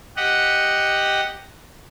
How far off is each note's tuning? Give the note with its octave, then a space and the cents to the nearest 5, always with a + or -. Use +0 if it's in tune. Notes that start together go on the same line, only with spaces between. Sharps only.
G4 +0 D#5 +0 F#5 +0